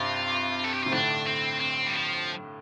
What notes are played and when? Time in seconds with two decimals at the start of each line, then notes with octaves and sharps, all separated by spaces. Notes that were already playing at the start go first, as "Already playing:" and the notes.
Already playing: G2 C3 F4
0.65 A4
0.74 G4
0.83 C3 F4
0.92 A2 D3 D4
1.26 C4
1.60 C4
1.86 G3
1.94 F3